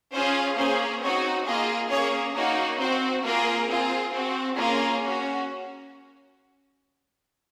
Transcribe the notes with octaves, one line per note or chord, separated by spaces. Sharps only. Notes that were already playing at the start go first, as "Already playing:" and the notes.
C#4 F4 G#4 C5
A#3 C#4 G#4 C5
C4 D#4 F#4 C#5
A#3 F4 G#4 D#5
A#3 C#4 G#4 C#5
A#3 D#4 F#4 C#5
C4 F#4 C5
A#3 F4 G#4 A#4
C4 F4 G#4
C4 F#4
A#3 C#4 F4 G#4 A#4
C#4 F#4